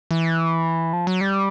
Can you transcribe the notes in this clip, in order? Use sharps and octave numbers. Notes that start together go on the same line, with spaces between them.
E3
F3
F#3
G3